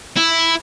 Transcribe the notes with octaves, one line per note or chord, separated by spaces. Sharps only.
E4